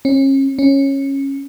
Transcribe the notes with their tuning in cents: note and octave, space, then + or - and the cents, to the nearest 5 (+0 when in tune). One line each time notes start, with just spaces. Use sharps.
C#4 -35
C#4 -15